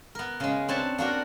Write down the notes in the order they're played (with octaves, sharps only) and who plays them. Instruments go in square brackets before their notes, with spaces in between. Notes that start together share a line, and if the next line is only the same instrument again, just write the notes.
[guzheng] B3 A#4
C#3 G#3
C4 D4 B4 C#5 A5
A#3 D4 F#4 A#4